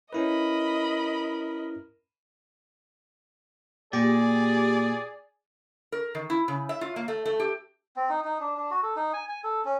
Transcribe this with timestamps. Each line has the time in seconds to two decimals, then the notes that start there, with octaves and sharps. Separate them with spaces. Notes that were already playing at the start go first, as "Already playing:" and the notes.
0.13 C#4 E4 A#4 B4 D#5 B5
3.93 A#2 G4 G#4 D5
5.92 A#4
6.15 D#3
6.30 E4
6.48 C#3
6.69 E5
6.81 F4
6.96 A#3
7.08 A3
7.25 A3
7.40 G4
7.96 C4
8.10 D#4
8.25 D#4
8.40 D4
8.57 D4
8.71 F#4
8.83 A4
8.96 D#4
9.13 G#5
9.29 G#5
9.44 A4
9.65 C#4